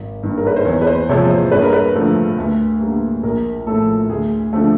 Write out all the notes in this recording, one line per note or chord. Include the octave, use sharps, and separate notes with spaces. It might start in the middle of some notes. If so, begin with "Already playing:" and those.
Already playing: G#1
G2 D#3
A#4
B4
C5
E2 C#5
B4
C5
C3 F3 G#3 C#5
C5
G2 B4
A#4
B4
D3 F3 A3
D2
D3 G3 A#3
A#1 A#4
A2 F3 A4
D2 G#4
D3 F3 A3